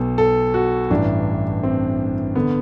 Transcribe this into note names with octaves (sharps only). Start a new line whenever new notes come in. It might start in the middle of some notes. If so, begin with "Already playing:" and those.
Already playing: B1 B2 A4
A4
F#4
A1 G2 E3 D4
C4
D3 B3